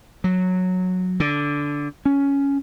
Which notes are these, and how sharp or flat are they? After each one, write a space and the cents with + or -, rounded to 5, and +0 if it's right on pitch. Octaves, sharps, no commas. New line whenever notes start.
F#3 -10
D3 -10
C#4 +10